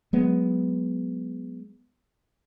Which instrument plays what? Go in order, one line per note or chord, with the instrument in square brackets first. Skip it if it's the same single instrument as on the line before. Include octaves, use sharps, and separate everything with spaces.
[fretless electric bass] F#3 G#3 B3